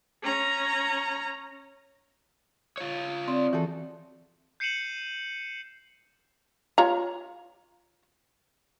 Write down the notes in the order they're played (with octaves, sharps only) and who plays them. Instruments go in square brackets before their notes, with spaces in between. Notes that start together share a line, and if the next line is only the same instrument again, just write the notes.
[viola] C#4 A#5
[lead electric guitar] F4 C#5
[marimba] C4 [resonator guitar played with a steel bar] D5
[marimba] E3 [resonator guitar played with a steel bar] F#4 G#4 A4
[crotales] G6 C7 C#7 D#7 E7 F#7
[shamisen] F4 C#5 A#5